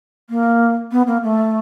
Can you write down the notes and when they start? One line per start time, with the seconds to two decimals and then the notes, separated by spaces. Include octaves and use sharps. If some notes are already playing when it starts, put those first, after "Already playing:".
0.30 A#3
0.91 B3
1.07 A#3
1.23 A3